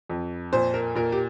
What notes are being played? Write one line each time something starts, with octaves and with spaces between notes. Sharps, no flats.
F2
A#2 C5
A#4
A#2 A#4
G4